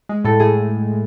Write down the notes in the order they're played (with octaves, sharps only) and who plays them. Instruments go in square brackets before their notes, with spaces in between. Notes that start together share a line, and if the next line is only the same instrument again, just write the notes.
[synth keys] G#3
[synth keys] A2 [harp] A4
[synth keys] A2 [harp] G#4